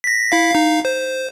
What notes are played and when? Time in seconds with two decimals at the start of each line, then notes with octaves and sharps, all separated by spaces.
0.04 A#6 B6
0.31 E4 F5 B6
0.51 D#4 F5
0.85 C5